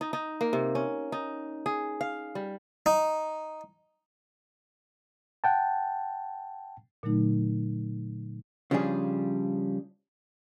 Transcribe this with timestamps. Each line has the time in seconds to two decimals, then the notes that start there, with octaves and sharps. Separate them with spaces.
0.01 D#4
0.13 D#4
0.41 A#3
0.53 C3
0.75 C#4
1.12 D#4
1.66 G#4
2.01 F5
2.35 G3
2.86 D#4
5.44 F#5 G5 A5
7.03 A#2 D3 F#3 A3 D#4
8.71 C#3 F3 G3 D4 G#4